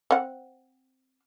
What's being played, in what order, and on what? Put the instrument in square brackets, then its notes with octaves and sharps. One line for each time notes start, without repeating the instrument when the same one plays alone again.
[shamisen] C4 F#5